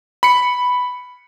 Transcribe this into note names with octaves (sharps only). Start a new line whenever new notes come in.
B5 C#7